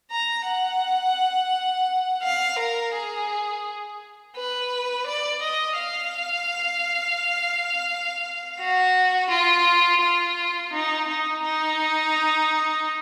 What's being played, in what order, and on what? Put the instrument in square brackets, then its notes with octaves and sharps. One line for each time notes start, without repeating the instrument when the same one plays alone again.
[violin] A#5
F#5
F5
A#4
G#4
B4
D5
D#5
F5
F#4
F4
F4
D#4
D#4
D#4